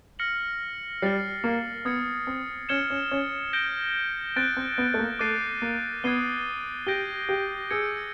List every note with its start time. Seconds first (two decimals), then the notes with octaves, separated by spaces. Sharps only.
0.19 F6 A#6 C#7 F#7
1.02 G3 F6 A6 C7
1.44 A#3
1.85 B3 D#6 G#6 C#7
2.27 C4
2.69 C#4 F6 G#6 C#7 E7 G7
2.90 C#4
3.11 C#4
3.53 G6 A#6 D7 G7
4.36 C4 F#6 A6 D7
4.57 C4
4.78 B3
4.94 A3
4.99 A#3
5.19 A3 D6 F#6 A6 C7 D#7
5.62 A#3
6.04 B3 D#6 G#6 C7 D#7 G7
6.87 G4 G6 A#6 D7 G7
7.29 G4
7.70 G#4 E6 G#6 C#7